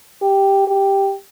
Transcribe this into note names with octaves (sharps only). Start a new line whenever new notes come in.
G4
G4